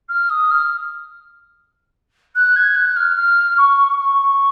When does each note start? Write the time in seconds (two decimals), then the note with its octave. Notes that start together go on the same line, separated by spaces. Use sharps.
0.09 F6
0.29 D#6
0.51 F6
2.35 F#6
2.56 G#6
2.76 F#6
2.96 F6
3.17 F6
3.57 C#6
4.00 C#6